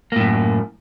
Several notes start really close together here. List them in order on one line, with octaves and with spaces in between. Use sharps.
A#3 A2 F#2